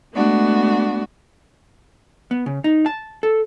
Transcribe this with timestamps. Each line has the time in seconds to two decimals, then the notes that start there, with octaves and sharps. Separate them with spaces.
0.12 G#3 A3 B3 D4 F#4
2.31 B3
2.46 C#3
2.64 D#4
2.86 A5
3.23 A4